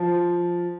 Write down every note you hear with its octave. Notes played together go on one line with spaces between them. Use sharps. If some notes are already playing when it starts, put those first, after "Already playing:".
Already playing: F3